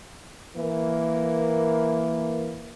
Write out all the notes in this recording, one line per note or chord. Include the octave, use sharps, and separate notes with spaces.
E3 A#3